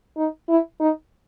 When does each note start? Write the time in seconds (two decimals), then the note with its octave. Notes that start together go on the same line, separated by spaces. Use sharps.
0.17 D#4
0.49 E4
0.80 D#4